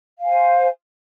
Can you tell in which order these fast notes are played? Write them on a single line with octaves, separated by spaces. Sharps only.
F5 G#5 C5